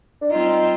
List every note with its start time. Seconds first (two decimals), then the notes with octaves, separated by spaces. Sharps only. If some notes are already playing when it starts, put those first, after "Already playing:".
0.22 D4
0.31 G3 C4 D#4 F4